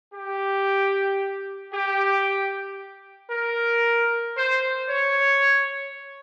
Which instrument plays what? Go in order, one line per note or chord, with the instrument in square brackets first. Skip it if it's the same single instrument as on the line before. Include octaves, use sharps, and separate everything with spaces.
[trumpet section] G4
G4
A#4
C5
C#5